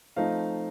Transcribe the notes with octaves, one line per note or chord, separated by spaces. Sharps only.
F3 A3 C4 D#4 F5